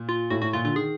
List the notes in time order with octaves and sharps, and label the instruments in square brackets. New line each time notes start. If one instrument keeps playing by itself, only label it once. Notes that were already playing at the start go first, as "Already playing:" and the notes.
Already playing: [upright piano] A#2
[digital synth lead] F4
[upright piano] A2 [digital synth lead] F#4
[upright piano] A2 [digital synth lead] F#4
[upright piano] A#2 [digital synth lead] F4
[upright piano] D3 [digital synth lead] F4
[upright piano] D#3 [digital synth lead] G#4